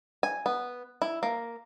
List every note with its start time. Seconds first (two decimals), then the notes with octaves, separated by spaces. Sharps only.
0.23 G#5
0.46 B3
1.02 E4
1.23 A#3